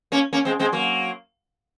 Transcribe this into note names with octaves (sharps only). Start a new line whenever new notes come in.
A#3 C#4
A#3 C#4
G#3 C4
G#3 C4
F#3 A#3